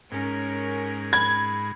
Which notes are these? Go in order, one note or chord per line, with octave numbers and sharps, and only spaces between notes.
G#2 C#4 A#4
B5 G#6